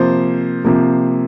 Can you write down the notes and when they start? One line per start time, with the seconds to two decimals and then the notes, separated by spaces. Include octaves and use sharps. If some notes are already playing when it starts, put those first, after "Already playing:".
Already playing: C3 F3 A#3 C5
0.65 C3 F3 A#3